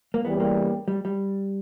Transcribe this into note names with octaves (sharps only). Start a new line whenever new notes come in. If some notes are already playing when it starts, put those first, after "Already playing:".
A#3
E2 C#3 E3 G3 B3
A#3
G3
G3